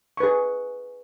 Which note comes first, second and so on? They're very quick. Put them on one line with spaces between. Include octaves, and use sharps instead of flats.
C#6 B4 G#4